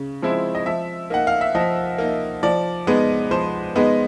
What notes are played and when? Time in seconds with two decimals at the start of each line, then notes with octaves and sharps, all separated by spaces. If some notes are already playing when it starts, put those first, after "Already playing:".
Already playing: C#3
0.22 F3 G#3 C4 E4
0.55 D#5
0.66 F3 E5
1.10 A#3 D#4 F#5
1.27 F5
1.41 E5
1.55 F3 D#5
1.98 A#3 D#4
2.43 F3 D5
2.87 G#3 B3 D#4
3.31 F3 C5
3.75 G#3 B3 D#4